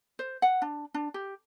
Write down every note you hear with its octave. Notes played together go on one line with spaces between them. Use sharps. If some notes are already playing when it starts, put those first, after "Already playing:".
C5
F#5
D4
D4
G4